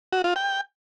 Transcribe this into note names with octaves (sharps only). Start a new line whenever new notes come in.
F#4
F4
G5